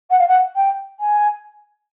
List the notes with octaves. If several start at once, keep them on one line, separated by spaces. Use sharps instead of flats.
F#5
F5
F#5
G5
G#5